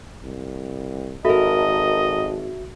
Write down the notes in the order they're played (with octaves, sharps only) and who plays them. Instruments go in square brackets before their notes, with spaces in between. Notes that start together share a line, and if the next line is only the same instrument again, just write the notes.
[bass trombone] C2
[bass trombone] G#1 [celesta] F#4 E5 [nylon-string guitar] A4 A#4 [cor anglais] D#5